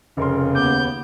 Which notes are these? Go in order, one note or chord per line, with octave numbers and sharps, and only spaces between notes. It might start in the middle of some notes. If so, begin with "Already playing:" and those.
F1 C#3 A#4 C6
D#2 B3 D6 G6